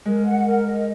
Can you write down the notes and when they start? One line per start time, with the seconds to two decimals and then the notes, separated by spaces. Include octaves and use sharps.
0.05 G#3 A#4
0.26 F#5
0.46 A#4
0.66 D#5